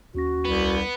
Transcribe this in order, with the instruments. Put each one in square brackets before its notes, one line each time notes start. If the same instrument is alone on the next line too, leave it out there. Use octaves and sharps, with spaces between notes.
[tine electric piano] D#2 C#4 A#6 [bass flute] F#4
[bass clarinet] C2 [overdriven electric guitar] B3